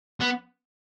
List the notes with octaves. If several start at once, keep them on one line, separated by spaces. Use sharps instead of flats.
B3